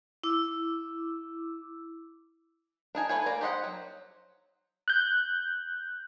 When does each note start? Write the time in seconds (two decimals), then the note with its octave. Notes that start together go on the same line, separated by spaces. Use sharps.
0.24 E4 D6 E6
2.95 D4 D#4 G#5
3.09 A3 F#4 B4 C#5 G#5
3.26 A#3 D5 A#5
3.41 G4 C5 D#5 F5 F#5
3.64 F#3
4.88 F#6 G6